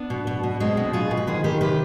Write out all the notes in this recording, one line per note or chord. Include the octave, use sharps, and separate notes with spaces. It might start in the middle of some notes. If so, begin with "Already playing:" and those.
Already playing: B3 D4
B2
B2
B2
B2 G#3 C4
B2
B2 F4 G#4
B2
B4
D#3 G#4 C5
D#3 G4 B4
C3 G4 B4